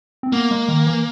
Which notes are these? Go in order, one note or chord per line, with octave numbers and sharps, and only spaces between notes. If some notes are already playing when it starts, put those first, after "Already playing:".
C4
A#3 B3
G#3
D#3
E3